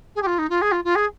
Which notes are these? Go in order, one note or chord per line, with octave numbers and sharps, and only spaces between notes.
G#4
G4
F4
D#4
F4
G#4
F4
F4
G#4